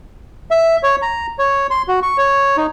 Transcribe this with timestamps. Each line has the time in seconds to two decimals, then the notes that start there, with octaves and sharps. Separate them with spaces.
0.51 E5
0.83 C#5
1.02 A#5
1.39 C#5
1.70 C6
1.88 F#4
2.03 C#6
2.18 C#5
2.57 D#4